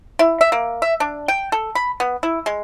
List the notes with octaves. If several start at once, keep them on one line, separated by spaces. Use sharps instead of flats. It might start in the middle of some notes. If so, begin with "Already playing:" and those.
E4
E5
A#3
E5
D4
G5
A4
B5
B3
E4
G#3